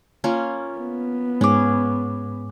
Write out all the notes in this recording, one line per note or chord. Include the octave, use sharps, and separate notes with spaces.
A#3 C#4 F4
B3
G#2 C#4 G#4 D6